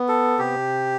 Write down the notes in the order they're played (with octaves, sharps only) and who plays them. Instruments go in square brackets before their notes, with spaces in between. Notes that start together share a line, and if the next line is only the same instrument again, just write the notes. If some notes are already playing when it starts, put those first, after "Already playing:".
Already playing: [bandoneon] B3
[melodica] A4
[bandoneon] C3 [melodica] G4